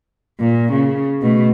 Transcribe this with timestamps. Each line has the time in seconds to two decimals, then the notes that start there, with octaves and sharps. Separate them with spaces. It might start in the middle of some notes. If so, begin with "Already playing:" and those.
0.40 A#2
0.73 C#3
1.22 B2 A3